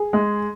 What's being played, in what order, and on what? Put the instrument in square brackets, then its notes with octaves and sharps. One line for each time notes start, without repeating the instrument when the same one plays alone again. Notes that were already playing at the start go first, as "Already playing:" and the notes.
Already playing: [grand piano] G#4
[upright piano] G#3